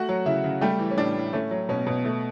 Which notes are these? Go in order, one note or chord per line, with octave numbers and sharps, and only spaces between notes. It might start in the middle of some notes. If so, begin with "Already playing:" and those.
Already playing: A3 F#4 F#5
F#3
C#3 E4 E5
C#3
G3 A3 G4
E3
C#4
A2 D4
A2
A3 C#4
F#3
B2 C#4
B2
A3